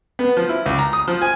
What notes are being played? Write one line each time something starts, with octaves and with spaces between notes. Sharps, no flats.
B3
F3
E4
C#2
A#5
D#6
F3
G#5